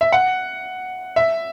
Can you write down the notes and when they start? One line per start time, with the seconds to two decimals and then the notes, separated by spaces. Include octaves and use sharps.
0.01 E5
0.12 F#5
1.16 E5